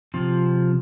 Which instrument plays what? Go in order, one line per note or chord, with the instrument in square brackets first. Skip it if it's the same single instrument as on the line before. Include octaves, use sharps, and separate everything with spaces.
[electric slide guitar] C3 F3